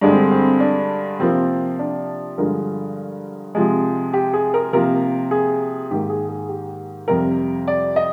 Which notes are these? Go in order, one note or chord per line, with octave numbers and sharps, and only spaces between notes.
G2 D3 G#3 D4
C4
C4
D4
C3 F3 A#3 C4
D4
G2 D3 F3 G#3 A#4
C3 F3 G#3
G4
G#4
A#4
C3 F3 A#3 A#4
G#4
G#2 D#3 A#3 G4
G#4
G#4
G4
F2 C3 G3 A#4
D5
D#5